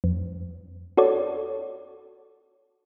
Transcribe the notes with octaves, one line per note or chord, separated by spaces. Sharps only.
F2
F#4 A4 C#5 D5